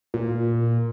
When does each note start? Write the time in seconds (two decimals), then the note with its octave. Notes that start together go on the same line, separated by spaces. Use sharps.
0.14 A#2